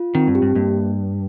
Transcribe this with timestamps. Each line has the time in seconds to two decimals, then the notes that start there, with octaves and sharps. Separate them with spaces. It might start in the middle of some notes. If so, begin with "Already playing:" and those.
Already playing: F4
0.15 D#3 C4
0.27 G2
0.35 G4
0.42 G2
0.55 G2 A#3